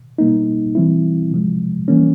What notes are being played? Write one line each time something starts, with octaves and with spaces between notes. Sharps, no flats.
B2 G3 A#3 D#4
E3 G3 C4 E4
C3 F3 G#3
E3 G3 A#3 C#4